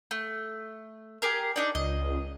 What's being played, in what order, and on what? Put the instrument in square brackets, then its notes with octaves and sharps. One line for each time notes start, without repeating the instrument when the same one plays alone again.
[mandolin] A3
G4 G#4 A#4
D4 D#4 D5
[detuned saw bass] C#2 [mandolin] D#5